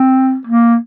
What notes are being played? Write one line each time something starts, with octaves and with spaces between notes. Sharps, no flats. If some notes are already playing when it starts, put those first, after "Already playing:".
Already playing: C4
A#3